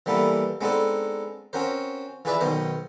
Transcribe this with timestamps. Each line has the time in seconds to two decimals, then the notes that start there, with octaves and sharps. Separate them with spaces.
0.06 E3 G3 A#3 B3 A4
0.61 G#3 B3 C4 D4 D#4 A4
1.53 C4 C#4 F#4 A#4 C5
2.25 E3 F4 G#4 B4 D5 E5
2.40 B1 B2 D#3 C5 D#5